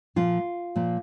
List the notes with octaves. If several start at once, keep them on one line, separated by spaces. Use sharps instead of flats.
A#2 F3 A#3 F4
A#2 F3 A#3